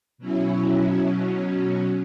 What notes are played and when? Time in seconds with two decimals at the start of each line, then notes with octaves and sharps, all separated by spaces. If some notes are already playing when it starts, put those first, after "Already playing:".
0.18 B2 F#3 C#4 E4
1.02 B2 F#3 C#4